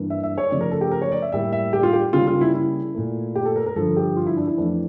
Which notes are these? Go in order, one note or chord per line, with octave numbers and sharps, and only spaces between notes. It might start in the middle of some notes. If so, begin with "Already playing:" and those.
Already playing: G2 E3 A#3
E5
E5
C#5
C#3 F3 A3 D5
A#4
A4
G4
A#4
C#5
D5
E5
A2 G3 A#3 E5
E5
G4
F4
G4
C#3 G3 A#3 F4
F4
E4
E4
A#2 A3
G4
A4
A#4
A#4
G2 D3 F3 A4
G4
F4
E4
D4
E4
F2 E3 A3 D4